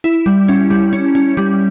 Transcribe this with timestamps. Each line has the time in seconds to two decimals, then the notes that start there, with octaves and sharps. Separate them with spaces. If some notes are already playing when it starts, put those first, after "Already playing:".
0.04 E4
0.26 G3
0.48 C#4
0.70 G3
0.93 C#4
1.15 C#4
1.37 G3